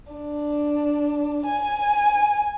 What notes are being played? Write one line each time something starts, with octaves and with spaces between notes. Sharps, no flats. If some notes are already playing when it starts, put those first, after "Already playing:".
D4
G#5